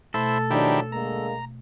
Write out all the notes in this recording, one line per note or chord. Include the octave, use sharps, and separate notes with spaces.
B2 A3 E4 A4 C5
D#3 F3 F#3 D4 E4 G4
D3 G#3 A#3 A#5